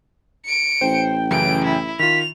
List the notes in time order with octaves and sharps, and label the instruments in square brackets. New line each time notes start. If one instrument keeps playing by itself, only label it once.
[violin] C#7 D7
[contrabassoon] A1 [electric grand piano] C5 [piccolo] G5
[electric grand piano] F#2 C#3 E3 [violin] D7
[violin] E4
[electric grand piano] D#3 F4 [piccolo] B6 [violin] F7